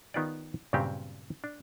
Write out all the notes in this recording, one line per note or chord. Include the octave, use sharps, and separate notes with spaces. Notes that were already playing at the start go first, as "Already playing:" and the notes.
D#3 B3 D#4 F4 G4 D5
G2 A#2 C#3 F#3 C4 G4
D4